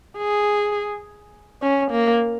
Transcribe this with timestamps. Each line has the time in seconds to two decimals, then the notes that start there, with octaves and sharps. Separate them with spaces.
0.17 G#4
1.62 C#4
1.91 A#3